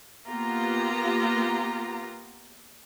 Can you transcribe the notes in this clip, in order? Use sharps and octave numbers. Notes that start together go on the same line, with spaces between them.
A#3 B3 F4 G4 A#5